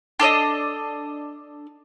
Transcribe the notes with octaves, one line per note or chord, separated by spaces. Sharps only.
D4 A4 C#5 D#5